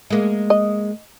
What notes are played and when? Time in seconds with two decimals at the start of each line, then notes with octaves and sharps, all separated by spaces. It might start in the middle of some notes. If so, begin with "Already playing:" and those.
0.10 G#3 A#3
0.50 D#5